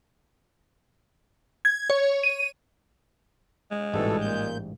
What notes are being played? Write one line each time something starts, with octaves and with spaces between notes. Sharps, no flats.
G#6
C#5
D#7
G#3
A1 G#2 B2 E3 G3 A4
A#2 G6